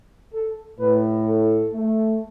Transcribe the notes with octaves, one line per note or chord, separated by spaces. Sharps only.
A4
A2 B4
A4
A3